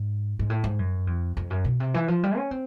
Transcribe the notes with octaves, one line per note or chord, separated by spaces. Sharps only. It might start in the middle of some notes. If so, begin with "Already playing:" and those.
Already playing: G#2
G#2
A2
G#2
F#2
F2
F2
F#2
B2
C3
E3
F3
G3
C#4
C4